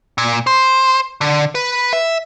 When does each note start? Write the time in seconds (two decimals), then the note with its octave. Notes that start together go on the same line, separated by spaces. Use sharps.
0.18 A#2
0.47 C5
1.21 D3
1.55 B4
1.93 E5